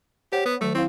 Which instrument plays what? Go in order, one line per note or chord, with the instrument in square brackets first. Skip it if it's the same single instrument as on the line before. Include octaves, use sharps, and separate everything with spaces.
[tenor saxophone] G4 [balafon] C5 C#5 F#5
[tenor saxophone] B3
[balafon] D#3 F#3 [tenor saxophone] A3
[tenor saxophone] C4 [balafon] E4 F5